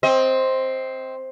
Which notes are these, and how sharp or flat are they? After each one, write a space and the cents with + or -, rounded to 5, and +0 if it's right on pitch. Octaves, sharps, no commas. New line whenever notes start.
C4 +5 D#5 +25